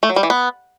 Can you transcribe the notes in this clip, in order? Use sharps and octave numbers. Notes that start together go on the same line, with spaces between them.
A3
F#3
G3
E3
B3